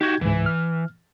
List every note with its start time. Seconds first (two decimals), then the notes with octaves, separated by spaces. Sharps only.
0.01 D#4 F#4 G4 G6 G#6
0.21 C#2 G#2 E3
0.46 F6